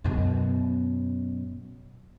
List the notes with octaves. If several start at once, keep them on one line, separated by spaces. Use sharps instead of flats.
F#2 B2